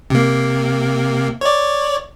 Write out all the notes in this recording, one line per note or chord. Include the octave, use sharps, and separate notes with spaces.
C3 A#3
C#5 D5